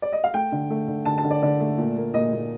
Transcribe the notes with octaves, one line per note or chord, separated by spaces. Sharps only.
D5
D#5
F5
A3 G5
D3
A3
D3
D3 A5
A5
D3
D5
D3 D5
A3
A#2
A#3
A#2 D#5
A#2